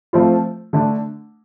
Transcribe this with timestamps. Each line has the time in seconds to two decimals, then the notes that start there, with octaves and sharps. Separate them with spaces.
0.13 F3 A3 C4 F4
0.73 D3 A3 D4